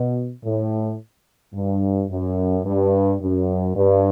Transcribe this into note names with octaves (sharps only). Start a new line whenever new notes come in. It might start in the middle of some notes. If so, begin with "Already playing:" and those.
Already playing: B2
A2
G2
F#2
G2
F#2
G2